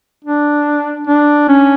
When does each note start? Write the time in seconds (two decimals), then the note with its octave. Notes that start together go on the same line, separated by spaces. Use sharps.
0.24 D4
1.07 D4
1.49 C#4